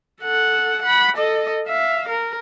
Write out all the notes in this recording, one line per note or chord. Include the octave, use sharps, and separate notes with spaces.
A4 F#5
F#5 B5
A4 D#5
E5 F5
A#4